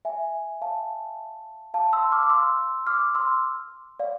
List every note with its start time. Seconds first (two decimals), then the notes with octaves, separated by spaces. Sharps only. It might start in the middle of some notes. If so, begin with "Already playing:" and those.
0.05 E5 G#5
0.62 F5 A5
1.74 F5 A5
1.93 C6 E6
2.12 D6 F6
2.23 D6
2.30 C6 E6
2.87 D6 F6
3.15 C6 E6
4.00 D5 F5